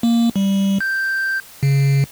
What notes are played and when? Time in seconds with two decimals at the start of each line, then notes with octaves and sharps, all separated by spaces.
0.03 A#3
0.36 G3
0.81 G6
1.63 C#3